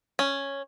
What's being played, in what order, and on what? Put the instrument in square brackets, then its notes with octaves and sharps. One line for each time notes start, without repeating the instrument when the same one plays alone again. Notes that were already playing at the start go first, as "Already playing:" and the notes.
[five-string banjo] C#4